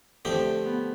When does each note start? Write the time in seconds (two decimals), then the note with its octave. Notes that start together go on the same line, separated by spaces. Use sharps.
0.25 D3 F3 A3 C4 G4
0.45 A3
0.65 B3